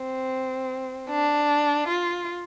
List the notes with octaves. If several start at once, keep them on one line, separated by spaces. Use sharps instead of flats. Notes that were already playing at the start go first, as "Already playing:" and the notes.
Already playing: C4
D4
F4